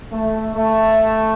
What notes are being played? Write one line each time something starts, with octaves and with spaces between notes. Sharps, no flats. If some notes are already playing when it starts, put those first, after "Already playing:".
A3
A3